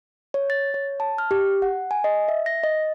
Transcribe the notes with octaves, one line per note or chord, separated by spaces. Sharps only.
C#5
A6
C#5
A5
F6
G4
F#5
G#5
D#5
E5
A#6
D#5